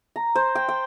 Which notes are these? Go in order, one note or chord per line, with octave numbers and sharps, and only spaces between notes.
A#5
C5
G5
G5